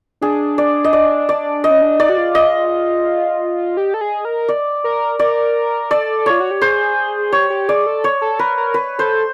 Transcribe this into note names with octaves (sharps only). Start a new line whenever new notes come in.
D4 G#4
D5
D#5
D5
D5
D#5
C#4
D4
D#4 D5
F#4
F4
D#5
G4
A4
G#4
A#4
D5
A#4
A#4 D5
A4 D5
F4 C#5
F#4
G4
G#4 C5
G4 C#5
G4
G#4 D5
A4
C#5
A4
A#4 B4
A#4
B4
A4 C5